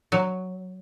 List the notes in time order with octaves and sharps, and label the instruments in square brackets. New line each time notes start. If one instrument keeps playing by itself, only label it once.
[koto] F#3